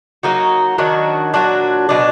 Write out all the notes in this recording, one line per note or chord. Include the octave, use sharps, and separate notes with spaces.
F#3 A#3 D#4 F#4
D#3 F#3 D4 F#4
A#2 F#3 D4 F#4
B2 F#3 D4